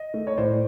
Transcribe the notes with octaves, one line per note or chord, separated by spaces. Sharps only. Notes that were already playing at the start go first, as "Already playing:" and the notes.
Already playing: D#5
A3
C#5
A2 C5 D5